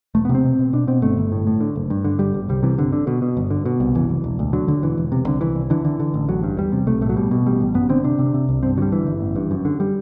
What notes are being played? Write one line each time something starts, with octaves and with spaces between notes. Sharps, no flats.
E1 A3
B3
C3
C4
B2
B2
B2 D4
B2 C4
G1 A3
G1
A2
A2
D3
F#1
G2
D3
G1 G3
G1
C2 G3
C3 E3
G1 D3
D3
B2
B2
G1
D3
B2
C2
F#1 E3
F#1
E1
D2
D3 F#3
D3
E1 E3
E1
C3
C2 D3
C2 E3
C2
D3 E3
D3
D3
A1
A1 F#3
G2
E2 G3
C3
B1 A3
A2 A3
F#3
B2 G3
B2
A1 G3
A1
F#2 B3
D3 C4
C3 D4
C3
C3
C2
G2 C4
D3 F#3 G3
G1 E3
G1
A1
G2
F#2
D3
G3